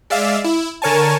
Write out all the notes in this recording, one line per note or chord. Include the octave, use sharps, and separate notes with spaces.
G#3 D5 E5 F5
E4
D3 A#4 C#5 G#5 A5